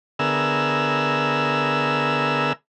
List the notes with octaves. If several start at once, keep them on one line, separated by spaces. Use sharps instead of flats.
D3 B3 G#4 A#4 E5 E6